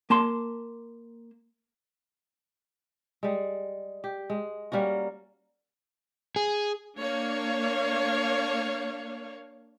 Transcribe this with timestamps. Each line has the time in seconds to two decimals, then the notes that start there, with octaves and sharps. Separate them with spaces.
0.10 A#3 A5 C6
3.23 G3 G#3
4.04 G4
4.30 G#3
4.72 G3 A#3 C#4 F#4
6.36 G#4
6.97 A#3 D4 C#5 F5